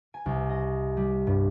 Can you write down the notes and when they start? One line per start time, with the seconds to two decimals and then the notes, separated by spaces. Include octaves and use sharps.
0.14 G#5
0.26 C2
0.49 D#5
0.97 G3
1.27 G2